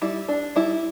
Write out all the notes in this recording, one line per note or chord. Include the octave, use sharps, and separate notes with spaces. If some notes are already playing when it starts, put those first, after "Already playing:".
G3 E4
D4
G3 E4